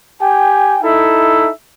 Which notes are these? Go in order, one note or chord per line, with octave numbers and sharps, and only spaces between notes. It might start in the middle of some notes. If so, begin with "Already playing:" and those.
G4 G5 G#5
D#4 E4 A4 E5